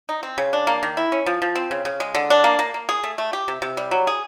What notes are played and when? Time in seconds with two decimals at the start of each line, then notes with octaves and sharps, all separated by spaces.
0.09 D#4
0.23 C4
0.38 C#3
0.53 D4
0.67 A#3
0.83 D#3
0.97 E4
1.12 C#4
1.26 F3
1.42 F3
1.55 C4
1.71 C#3
1.85 C#3
2.00 G#3
2.15 D3
2.30 D4
2.44 A#3
2.59 A#3
2.74 A#3
2.89 G#4
3.03 A3
3.18 A3
3.33 G4
3.48 C3
3.62 C3
3.77 G3
3.91 F#3
4.07 G#4